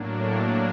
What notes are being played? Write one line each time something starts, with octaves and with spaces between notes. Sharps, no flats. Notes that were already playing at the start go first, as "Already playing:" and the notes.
Already playing: A2 F#3 A#3 D4